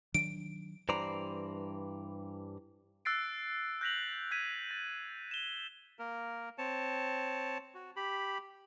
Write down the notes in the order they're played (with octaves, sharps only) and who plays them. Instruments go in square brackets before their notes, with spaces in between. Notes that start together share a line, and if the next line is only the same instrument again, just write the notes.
[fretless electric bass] D#3 F#3 D4 [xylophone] D7
[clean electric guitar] G2 E3 C5 D5 A#5
[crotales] E6 F#6 A6 C7 D7
F#6 G6 A#6 B6 F7 F#7
F#6 G#6 B6 D#7
A6
E7 G7
[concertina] A#3 A#4
C4 C#5 A5
F#4
G4 B5